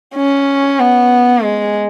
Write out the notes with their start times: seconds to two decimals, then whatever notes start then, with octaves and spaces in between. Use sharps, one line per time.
0.15 C#4
0.80 B3
1.43 G#3